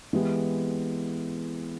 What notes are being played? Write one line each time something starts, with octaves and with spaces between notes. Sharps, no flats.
E3 G#3 B3 E4 G4